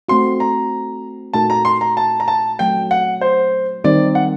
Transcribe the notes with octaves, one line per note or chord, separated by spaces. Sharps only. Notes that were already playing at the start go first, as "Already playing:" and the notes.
A3 C4 F#4 C6
A#5
A#2 A3 D#4 F#4 A#4 A5
A#5
C6
A#5
A5
A#5
A5
F#3 A3 C4 G5
F#5
C5
D#3 G3 C4 D#4 D5
F#5